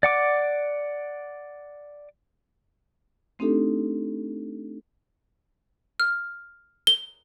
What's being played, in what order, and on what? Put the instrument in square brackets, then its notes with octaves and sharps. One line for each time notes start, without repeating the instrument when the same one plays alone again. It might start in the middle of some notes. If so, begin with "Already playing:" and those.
[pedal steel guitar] D5 F#5 D6
[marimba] A3 C4 D4 D#4 G4 A4
[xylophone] F6
G7